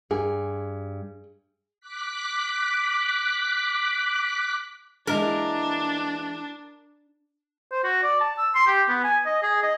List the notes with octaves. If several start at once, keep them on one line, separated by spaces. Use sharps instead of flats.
G2 G#4
D6 F#6 B6
E3 G#3 A#3 D4 A#4
C5
F#4
D5
A5
E6
C6
G4
B3
G#5
D#5
G#4
D#5